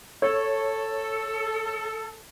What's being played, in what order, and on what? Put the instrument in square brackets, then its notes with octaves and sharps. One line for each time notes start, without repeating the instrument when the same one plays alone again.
[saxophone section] A4 [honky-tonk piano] C#5